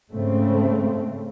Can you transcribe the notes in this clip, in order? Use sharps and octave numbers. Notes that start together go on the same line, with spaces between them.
G#2 C#3 A3 C4